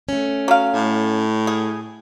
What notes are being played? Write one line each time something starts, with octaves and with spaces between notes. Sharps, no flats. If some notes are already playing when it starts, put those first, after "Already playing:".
A3 C#4
F#3 F5
A2
G#4